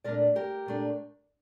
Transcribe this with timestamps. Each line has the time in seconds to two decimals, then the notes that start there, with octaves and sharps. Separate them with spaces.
0.04 A#2 A3 D4 A#4 D5
0.36 G4 A#4
0.66 A#2 A3 D4